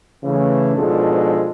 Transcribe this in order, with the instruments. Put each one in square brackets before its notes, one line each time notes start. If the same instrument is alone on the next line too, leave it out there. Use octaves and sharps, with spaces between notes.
[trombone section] C#3 E3 A3
G#2 B2 F3 G#3 D4 A4